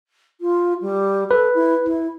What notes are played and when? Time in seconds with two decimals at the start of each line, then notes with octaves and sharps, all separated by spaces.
0.41 F4
0.81 G3
1.31 A4 B4
1.54 E4
1.85 E4